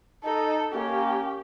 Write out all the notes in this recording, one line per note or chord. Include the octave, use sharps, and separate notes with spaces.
D#4 A4
A#3 C#4 G4